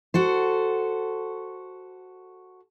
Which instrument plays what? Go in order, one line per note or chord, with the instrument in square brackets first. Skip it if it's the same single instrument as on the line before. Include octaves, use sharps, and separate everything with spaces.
[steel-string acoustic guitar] F#4 A4 C5